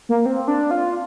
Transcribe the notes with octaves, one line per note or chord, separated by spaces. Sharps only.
A#3
C4
D4
F4